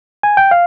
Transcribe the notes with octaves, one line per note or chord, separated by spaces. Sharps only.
G#5
G5
F5